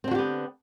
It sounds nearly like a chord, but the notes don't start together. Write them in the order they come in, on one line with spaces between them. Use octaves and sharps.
C4 D3 F#4 G4 B3